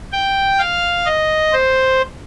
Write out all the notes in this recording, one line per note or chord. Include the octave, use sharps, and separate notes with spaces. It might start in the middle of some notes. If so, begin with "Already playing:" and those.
G5
F5
D#5
C5